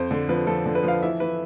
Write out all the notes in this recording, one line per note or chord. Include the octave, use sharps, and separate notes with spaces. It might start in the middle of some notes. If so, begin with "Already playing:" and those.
Already playing: F2 C5
D3
F3 B4
F3 A4
D3
B4
F3 F5
E3 E5
E3 B4